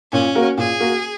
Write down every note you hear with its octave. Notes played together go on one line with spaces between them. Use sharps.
A#2 C#4
A#3 F#4 A#4
A#2 G#4
A#3 F#4 A#4